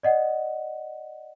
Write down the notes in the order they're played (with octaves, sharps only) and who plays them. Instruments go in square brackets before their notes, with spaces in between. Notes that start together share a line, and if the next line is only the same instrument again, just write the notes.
[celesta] D5 D#5 F#5